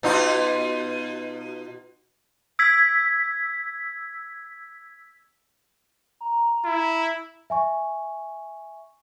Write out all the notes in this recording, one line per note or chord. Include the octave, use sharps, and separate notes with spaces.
B2 D#4 F4
E6 G#6 B6
A#5
E4
E5 G#5 C#6